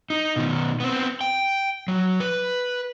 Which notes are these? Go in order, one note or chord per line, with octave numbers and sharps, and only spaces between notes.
D#4
B2 D#3
B3 C4
G5
F#3
B4